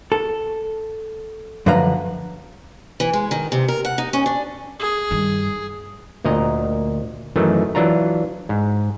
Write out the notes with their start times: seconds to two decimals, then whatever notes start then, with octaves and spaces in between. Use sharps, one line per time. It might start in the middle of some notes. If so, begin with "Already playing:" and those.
0.12 A4
1.66 F#2 D3 F3 B4 F5 A#5
3.00 E3
3.13 G#3
3.31 D#3
3.52 C3
3.68 A#4
3.85 F#5
3.98 D#4
4.13 C#4
4.26 D4
4.80 G#4
5.11 G2 D#3
6.25 D2 A#2 D#5 A#5
7.36 F#2 D#3 E3 F#3 A3
7.75 E3 F#3 D4 F4 A#5
8.49 G#2